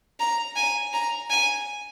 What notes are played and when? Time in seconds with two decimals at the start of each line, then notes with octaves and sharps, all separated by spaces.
0.19 A#5
0.56 G#5
0.93 A#5
1.30 G#5